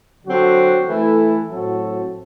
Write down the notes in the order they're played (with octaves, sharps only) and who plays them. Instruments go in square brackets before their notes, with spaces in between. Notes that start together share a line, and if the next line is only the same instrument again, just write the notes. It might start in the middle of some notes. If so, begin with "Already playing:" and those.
[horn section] D3 F#3 C4 F#4
E3 A3 E4 A4
A2 F#3 C4 F#4 A4